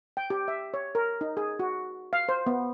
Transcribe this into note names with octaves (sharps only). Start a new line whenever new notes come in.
G5
G4
E5
C#5
A#4
D#4
G#4
F#4
F5
C5
B3